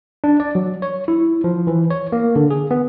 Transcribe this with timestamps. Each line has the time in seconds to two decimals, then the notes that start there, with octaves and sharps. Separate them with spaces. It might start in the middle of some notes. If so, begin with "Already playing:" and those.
0.24 D4
0.40 D5
0.55 F#3
0.82 C#5
1.08 E4
1.44 F3
1.67 E3
1.91 C#5
2.12 A#3
2.36 D3
2.50 G#4
2.71 B3